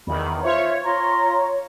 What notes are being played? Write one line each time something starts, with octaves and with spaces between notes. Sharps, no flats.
E2 D#3 B5
F4 C5 C#5 E5
F4 A#5 C6